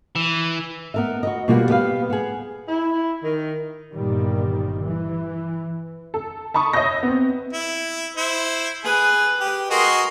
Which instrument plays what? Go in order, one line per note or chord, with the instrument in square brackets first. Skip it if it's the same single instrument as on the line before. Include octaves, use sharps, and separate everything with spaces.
[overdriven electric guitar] E3
[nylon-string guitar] B3 A#4 E5
F#4 B4 D#5
B2 G3 A#3 F4 F#4
B3 G4 B4 F5
B3 G#4
[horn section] E4
D#3
[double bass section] G1 A#2 D#3 G3
E3
[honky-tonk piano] A4
A5 B5 C#6 D#6
C#5 D#5 E5 D#6 G6 A#6
B3 C4
[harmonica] E4
E4 C5
[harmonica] G#4 [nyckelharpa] B4
[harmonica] G4
[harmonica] F#4 G#4 D#5 [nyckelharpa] A#4 C6